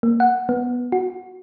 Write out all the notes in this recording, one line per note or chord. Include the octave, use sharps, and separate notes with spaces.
A#3
F#5
B3
F#4